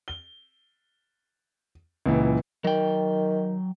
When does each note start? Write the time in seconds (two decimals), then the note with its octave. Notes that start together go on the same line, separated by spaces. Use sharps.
0.08 G7
2.06 C#2 A#2 E3
2.64 D#3 F#3 G5